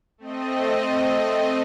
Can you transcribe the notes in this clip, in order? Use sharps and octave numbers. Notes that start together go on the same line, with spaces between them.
A3 C4 D#5